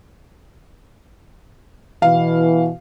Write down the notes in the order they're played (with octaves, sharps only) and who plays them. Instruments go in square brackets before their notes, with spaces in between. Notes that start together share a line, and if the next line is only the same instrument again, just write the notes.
[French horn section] B2 E3 [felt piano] F5